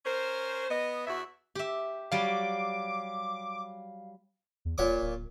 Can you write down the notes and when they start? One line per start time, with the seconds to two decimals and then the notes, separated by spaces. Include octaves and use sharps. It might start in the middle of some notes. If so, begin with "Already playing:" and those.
0.05 C#4 A#4 C5
0.70 B3 D#5
1.07 E2 F#4 E5
1.55 G4 E5
2.12 F#3 G3 F5 D6
4.65 E2
4.78 D#1 A#2 C#5 D6
5.02 D1